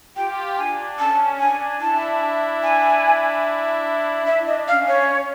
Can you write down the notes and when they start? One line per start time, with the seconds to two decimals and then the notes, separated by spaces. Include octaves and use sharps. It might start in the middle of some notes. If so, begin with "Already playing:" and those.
0.17 F4 G4 G5
0.57 D4 G#5
0.99 C#4 A5
1.40 D4 G#5
1.80 D4 E4 A5
2.63 G#5
4.27 D4 E5
4.47 D#5
4.68 C#4 F5
4.88 C#5